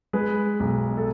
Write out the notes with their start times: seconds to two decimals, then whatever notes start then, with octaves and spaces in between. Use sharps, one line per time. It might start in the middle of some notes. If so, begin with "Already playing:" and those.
0.13 G#3 B4
0.60 B1
0.98 A4